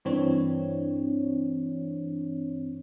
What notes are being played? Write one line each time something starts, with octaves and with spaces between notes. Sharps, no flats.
G2 E3 C4 D4 C#5